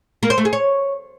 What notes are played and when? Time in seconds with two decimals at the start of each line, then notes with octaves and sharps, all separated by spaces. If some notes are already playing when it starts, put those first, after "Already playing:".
0.23 A#3
0.30 C5
0.38 A3
0.45 G#4
0.53 C#5